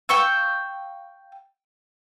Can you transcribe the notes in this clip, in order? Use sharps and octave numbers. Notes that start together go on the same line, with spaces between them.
F5 G5 C#6 E6